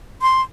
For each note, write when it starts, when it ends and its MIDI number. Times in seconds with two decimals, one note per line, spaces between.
0.22 0.42 84